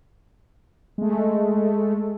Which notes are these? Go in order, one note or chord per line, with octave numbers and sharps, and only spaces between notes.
G#3 A3